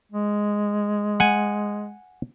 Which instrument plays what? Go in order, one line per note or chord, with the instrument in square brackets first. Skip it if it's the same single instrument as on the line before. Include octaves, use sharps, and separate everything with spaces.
[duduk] G#3
[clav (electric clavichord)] F#5 G#5